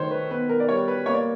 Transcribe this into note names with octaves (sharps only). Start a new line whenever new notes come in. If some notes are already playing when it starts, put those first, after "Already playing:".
Already playing: D#3 A3 C5 C#5
B4
B3 B4
A#4
D5
G3 C#5
B4
A#3 C#5
D5